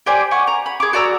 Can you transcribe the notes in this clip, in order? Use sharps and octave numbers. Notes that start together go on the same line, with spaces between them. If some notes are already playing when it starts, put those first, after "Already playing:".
G4 C5 D5 G#5
F#5 G#5 C#6
A#5
B5
G#4 D6
F#4 D5 A#5 E6